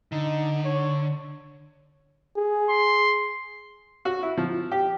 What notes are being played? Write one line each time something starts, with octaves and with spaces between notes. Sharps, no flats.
D3 D#4
C#5
G#4
C6
F#4
E4
F3
G4